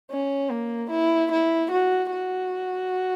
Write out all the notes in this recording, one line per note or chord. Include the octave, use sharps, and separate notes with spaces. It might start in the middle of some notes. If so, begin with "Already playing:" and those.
C#4
A#3
E4
E4
F#4
F#4